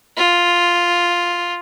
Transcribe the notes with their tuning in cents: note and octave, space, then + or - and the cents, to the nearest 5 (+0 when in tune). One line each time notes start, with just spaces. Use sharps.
F4 +0